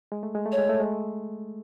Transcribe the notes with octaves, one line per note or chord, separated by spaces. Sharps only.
G#3
A3
G#3
A3
C#5
G#3
A3
G#3